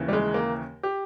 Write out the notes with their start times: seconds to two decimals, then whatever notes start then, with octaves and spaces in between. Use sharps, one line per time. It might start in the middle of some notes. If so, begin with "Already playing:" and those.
Already playing: D#2 C#3 E3
0.08 G3
0.13 G#3
0.34 A#3
0.83 G4